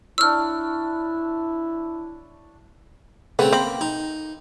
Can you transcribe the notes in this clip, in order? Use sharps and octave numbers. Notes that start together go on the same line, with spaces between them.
D4 E4 C#5 E6 F6
C#3 A3 B3 C4
A#3 C4 B5
D#4